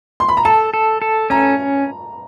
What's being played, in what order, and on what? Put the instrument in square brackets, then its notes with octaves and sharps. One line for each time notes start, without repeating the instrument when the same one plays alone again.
[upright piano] C6
B5
A#5
[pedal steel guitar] A4 [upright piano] A5
[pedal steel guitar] A4
A4
[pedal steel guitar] C#4 [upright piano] A#5